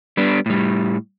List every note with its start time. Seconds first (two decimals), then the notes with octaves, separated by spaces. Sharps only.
0.17 G3 B3 D4
0.46 A2 G3